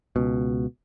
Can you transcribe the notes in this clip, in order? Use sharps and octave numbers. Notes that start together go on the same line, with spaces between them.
C#2 B2